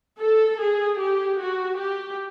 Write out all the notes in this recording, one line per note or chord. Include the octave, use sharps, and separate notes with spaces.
A4
G#4
G4
F#4
G4